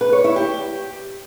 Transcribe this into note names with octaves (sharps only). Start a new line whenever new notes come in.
B4
C#5
E4
G4